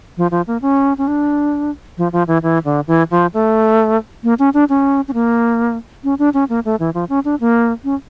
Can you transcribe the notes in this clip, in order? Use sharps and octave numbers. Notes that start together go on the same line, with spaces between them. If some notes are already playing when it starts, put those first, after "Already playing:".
F3
F3
A#3
C#4
C#4
D4
F3
F3
E3
E3
D3
E3
F3
A3
A#3
C#4
D4
C#4
C#4
A#3
C#4
D4
C#4
A#3
A3
E3
F3
C#4
D4
A#3
C#4